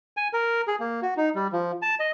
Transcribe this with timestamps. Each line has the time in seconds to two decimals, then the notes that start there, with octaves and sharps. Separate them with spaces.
0.17 G#5
0.33 A#4
0.68 G#4
0.80 A#3
1.02 F#4
1.17 D#4
1.35 G3
1.52 F3
1.82 A5
2.00 D#5